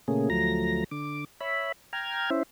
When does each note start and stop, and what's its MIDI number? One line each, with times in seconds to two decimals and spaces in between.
0.08 0.29 46
0.08 0.29 49
0.08 0.29 57
0.08 0.29 58
0.08 0.29 61
0.08 0.29 68
0.30 0.84 38
0.30 0.84 53
0.30 0.84 54
0.30 0.84 57
0.30 0.84 82
0.30 0.84 94
0.91 1.25 50
0.91 1.25 86
1.41 1.72 73
1.41 1.72 76
1.41 1.72 83
1.93 2.30 79
1.93 2.30 82
1.93 2.30 89
1.93 2.30 92
2.30 2.43 61
2.30 2.43 64
2.30 2.43 72
2.30 2.43 76